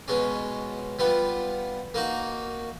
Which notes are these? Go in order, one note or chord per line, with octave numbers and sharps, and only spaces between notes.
B2 G#3 C#4
G3 B3 F4
A#3 D#4 F#4